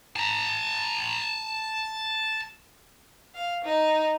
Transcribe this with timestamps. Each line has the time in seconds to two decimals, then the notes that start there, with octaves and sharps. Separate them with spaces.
0.16 A5 A#5
3.35 F5
3.65 D#4